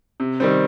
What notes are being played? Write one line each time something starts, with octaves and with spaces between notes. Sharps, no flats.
C3
D#3 G3 C4